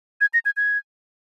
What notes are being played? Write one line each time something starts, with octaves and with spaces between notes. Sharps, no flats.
G#6
A#6
G#6
G#6